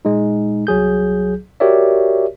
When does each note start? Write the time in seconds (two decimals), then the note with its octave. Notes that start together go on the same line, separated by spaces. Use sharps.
0.05 A#2 G#3 D#4
0.67 C2 F#3 G#4 G6
1.60 F#4 G4 A#4 C#5 D5 E5